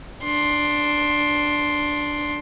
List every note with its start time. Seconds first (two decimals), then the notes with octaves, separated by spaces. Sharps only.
0.24 D4 C6